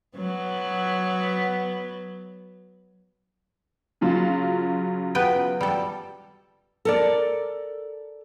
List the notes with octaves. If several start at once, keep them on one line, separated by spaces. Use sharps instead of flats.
F#3 B3
C#3 F#3 F4
B3 B4 G5
G3 A4
A4 A#4 D5